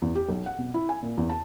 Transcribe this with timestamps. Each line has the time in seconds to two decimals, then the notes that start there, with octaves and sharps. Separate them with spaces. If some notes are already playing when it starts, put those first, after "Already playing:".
0.02 E2
0.15 G4
0.29 B1
0.46 F#5
0.58 B2
0.74 E4
0.89 G#5
1.02 A#2
1.18 E2
1.29 A5